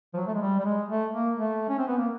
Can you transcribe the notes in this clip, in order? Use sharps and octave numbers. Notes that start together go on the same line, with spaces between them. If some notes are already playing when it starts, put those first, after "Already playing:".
F3
F#3
A3
G#3
G3
G3
G#3
A3
A#3
A3
C#4
C4
B3
A#3